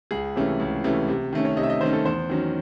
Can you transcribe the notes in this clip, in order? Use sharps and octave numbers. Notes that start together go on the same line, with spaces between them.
C#2 G#4
C3 E3 A3 C#4
C#2
C3 E3 A3 C#4
C3
D#3 A3 C#4
C#5
C3 D#5
E5
D#5
D#3 A3 C#4 C5
A4
E2 C5
D#3 F#3 C#4